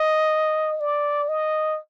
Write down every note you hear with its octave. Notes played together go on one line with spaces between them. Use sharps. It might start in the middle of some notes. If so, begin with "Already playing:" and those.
Already playing: D#5
D5
D#5